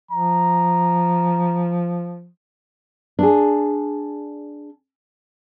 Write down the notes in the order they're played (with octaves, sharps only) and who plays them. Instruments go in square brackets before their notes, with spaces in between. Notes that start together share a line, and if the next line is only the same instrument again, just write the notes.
[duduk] F3 [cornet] A#5
[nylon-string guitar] D4 G#4